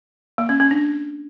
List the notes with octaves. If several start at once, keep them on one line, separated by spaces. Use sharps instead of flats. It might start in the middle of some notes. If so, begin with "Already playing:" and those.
A#3
C#4
C#4
D4